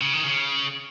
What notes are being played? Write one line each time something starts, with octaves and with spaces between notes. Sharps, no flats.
C#3
D#3
C#3